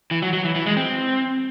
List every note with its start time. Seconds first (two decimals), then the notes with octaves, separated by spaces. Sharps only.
0.11 E3
0.22 F#3
0.33 F#3
0.44 E3
0.55 E3
0.66 G#3
0.77 C4